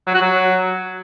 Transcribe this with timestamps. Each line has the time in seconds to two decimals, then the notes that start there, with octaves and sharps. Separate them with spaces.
0.07 F#3
0.14 F#4
0.21 F#3